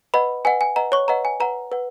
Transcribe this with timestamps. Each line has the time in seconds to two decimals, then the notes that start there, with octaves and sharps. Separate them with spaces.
0.14 B4 D#5 F#5 B5
0.45 B4 D#5 F#5 G#5
0.61 G#5
0.76 B4 D#5 F#5 A#5
0.92 C#5 C#6
1.08 B4 D#5 F#5 A#5
1.25 G#5
1.40 B4 F#5 A#5
1.72 B4 F#5